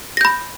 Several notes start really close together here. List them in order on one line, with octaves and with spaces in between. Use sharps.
A#6 G6 B5